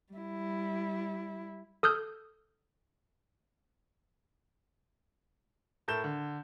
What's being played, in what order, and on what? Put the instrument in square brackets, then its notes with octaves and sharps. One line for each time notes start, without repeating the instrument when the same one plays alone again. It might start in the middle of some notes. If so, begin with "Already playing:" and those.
[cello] G3 E4
[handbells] A4 D#6 F6 G6
[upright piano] A2 A4 A#4 G6 E7
D3